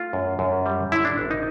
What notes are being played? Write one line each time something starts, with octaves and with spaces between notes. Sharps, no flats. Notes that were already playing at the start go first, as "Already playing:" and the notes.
Already playing: A3 F4
F#2
F#2
G3
D3 E4
D4
G#1
D#4